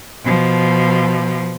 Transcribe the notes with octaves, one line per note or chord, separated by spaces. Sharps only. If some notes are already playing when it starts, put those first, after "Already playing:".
B2 F3